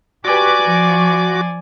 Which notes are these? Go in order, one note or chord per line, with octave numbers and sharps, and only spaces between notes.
F#4 G4 B4 D5 G#5 D6
F3